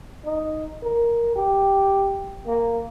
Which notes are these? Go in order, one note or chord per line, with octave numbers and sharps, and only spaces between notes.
D#4
A#4
G4
A#3